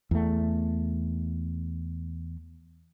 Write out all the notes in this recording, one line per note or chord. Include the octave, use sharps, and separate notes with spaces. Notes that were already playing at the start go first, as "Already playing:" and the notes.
E2 A3